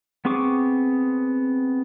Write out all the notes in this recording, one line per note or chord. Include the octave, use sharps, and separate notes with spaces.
B3 C4 G#4 C#6 D6